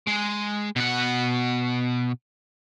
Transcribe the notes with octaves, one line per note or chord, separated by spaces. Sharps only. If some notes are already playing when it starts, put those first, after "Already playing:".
G#3
B2 F#5